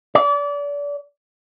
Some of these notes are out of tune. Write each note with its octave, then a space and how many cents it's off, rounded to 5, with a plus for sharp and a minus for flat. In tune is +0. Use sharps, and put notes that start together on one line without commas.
D5 -30